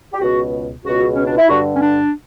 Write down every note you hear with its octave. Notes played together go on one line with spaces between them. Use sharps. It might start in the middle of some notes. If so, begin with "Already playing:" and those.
G4
C#2 B2 F#4
C#2 B2 F#4
C#4
D4
E4
G2 D3 F#4
C#4
D4